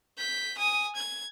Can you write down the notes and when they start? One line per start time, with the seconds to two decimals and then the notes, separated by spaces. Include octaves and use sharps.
0.18 G6 B6
0.58 G#5 D#6
0.95 G#6